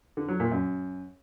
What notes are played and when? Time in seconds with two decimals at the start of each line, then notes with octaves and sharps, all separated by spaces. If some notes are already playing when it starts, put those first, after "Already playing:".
0.17 D3
0.28 F#3
0.40 A#2
0.51 F#2